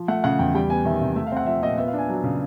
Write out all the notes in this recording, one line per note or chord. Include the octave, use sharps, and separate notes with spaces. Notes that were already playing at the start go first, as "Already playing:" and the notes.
Already playing: F3
A3 F#5
C#3 F#5
E2 G5
G3 G5
B3 G#5
D#3 E5
C3
A3 E5
F5
C4 F#5
F3 E5
A#2 D#5
B3 E5
F5
D4 G#5
F#3
C#3